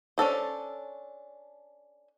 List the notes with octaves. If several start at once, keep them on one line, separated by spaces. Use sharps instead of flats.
C#4 D4 A4 C5